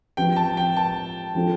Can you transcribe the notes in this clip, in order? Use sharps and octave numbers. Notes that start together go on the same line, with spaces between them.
F3 C4 G4 B4 G5
A5
G5
A5
F3 C4 F4 A4